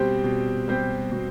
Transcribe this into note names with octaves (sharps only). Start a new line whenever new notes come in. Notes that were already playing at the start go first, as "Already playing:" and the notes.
Already playing: B2 G3 C4 G4 C5
B2
G3 C4 G4 C5
B2